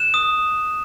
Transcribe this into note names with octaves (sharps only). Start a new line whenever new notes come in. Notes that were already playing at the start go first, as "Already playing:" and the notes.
Already playing: F#6 E7
D#6